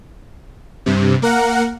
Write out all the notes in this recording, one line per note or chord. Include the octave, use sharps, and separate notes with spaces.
G2 C3
A#3 A#4 F#5